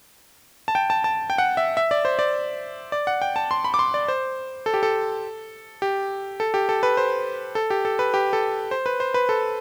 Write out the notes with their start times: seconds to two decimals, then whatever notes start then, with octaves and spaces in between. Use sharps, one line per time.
0.68 A5
0.75 G5
0.90 A5
1.04 A5
1.30 G5
1.38 F#5
1.57 E5
1.77 E5
1.91 D5
2.05 C5
2.19 D5
2.92 D5
3.07 F#5
3.22 G5
3.36 A5
3.51 C6
3.65 B5
3.74 D6
3.79 C6
3.94 D5
4.08 C5
4.66 A4
4.74 G4
4.83 A4
5.82 G4
6.40 A4
6.54 G4
6.69 A4
6.83 B4
6.97 C5
7.55 A4
7.70 G4
7.85 A4
7.99 B4
8.14 G4
8.33 A4
8.71 C5
8.86 B4
9.00 C5
9.14 B4
9.29 A4